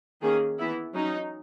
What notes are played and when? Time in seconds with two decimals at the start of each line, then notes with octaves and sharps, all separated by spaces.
0.21 D#3 A#3 C#4 G#4
0.58 E3 B3 E4
0.94 F#3 C#4 D#4